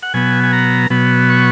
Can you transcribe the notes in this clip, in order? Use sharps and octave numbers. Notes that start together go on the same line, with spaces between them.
F#5
B2 F#3 B3 G#5
G#5
A#5
B2 F#3 B3
C#6